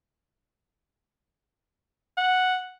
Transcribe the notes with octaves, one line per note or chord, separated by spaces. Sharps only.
F#5